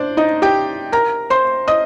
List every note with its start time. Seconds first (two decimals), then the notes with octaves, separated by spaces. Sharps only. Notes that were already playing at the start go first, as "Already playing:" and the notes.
Already playing: D4 C5 D5
0.17 D#4 D#5
0.42 G4 G5
0.92 A#4 A#5
1.30 C5 C6
1.68 D#5 D#6